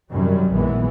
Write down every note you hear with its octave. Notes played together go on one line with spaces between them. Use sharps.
F#2 C3 D#3 F#3 G3
A#1 D#3 E3 G#3 B3